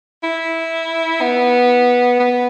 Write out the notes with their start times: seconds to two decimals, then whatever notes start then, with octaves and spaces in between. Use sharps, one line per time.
0.23 E4
1.21 B3
2.20 B3